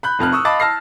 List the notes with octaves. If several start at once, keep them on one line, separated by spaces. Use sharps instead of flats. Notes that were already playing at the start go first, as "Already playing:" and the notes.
B5 F#6 G6
F1 F2 F6 F#6
C#6 D#6 E6 F#6
D#5 F5 A5 B5 D6 A6
A5 E6 F6 A#6 C7